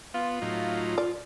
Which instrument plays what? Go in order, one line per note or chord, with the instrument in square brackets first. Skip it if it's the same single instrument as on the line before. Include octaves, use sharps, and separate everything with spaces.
[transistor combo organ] B3 [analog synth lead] F4
[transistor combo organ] A2 F#3 D#4
[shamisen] D5